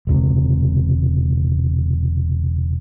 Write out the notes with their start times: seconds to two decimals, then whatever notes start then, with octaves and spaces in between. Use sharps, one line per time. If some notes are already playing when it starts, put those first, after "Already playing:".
0.07 E1 C#2 C3